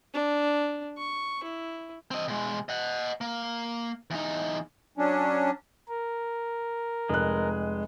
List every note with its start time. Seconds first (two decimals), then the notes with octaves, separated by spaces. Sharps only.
0.14 D4
0.97 C#6
1.43 E4
2.11 C4 D#5
2.28 B2 G#3
2.69 D#5 F#5
3.21 A#3
4.10 E2 D#4
4.98 F#3 C#4 D4
5.88 A#4
7.09 F1 G#3 F#6